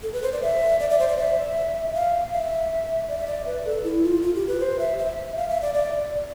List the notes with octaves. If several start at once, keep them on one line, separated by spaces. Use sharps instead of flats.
A4
B4
C5
D5
E5
D5
D5
C5
D5
E5
F5
E5
D5
E5
D5
B4
A4
E4
F4
F4
G4
B4
C5
E5
E5
F5
E5
D5
D5